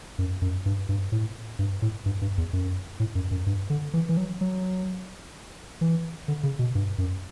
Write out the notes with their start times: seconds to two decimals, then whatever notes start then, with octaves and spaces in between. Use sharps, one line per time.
0.18 F#2
0.42 F#2
0.66 G2
0.89 G2
1.12 A2
1.59 G2
1.82 A2
2.06 G2
2.21 G2
2.38 E2
2.53 F#2
3.00 A2
3.15 F#2
3.31 F#2
3.46 G2
3.70 D3
3.93 E3
4.09 E3
4.17 F#3
4.41 F#3
5.81 E3
6.28 D3
6.43 C#3
6.59 B2
6.75 G2
6.98 F#2